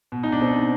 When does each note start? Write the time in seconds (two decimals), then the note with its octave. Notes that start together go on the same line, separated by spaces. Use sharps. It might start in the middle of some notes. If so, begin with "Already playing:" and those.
0.12 B2
0.23 D#4
0.32 D4
0.40 B2 C4